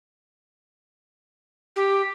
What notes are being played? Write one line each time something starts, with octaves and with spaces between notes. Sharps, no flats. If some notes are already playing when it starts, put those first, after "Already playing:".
G4